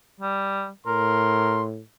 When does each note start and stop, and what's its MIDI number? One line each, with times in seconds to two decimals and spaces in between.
0.21 0.69 55
0.87 1.81 45
0.87 1.62 70
0.87 1.63 84